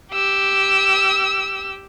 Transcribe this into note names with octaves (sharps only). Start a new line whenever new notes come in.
G4 E6